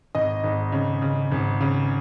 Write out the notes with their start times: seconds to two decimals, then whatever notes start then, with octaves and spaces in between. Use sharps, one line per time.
0.15 G#1 D#5
0.44 G#1
0.72 C#3
1.02 C#3
1.32 G#1
1.61 C#3